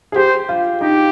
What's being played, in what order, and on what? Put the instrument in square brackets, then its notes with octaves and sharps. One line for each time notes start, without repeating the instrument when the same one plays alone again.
[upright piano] G#4
[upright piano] G4 [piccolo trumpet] C5
[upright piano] F4
[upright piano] D#4 [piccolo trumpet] G4